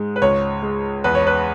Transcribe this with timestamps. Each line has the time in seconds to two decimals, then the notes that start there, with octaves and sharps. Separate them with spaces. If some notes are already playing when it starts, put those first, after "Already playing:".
Already playing: G#2 G#3
0.16 B4
0.22 C#2 C#5
0.62 G#3
1.04 E2 B4
1.15 C#5
1.27 B4